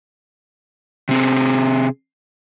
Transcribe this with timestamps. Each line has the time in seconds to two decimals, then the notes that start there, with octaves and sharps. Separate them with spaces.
1.09 C3 C4 G#4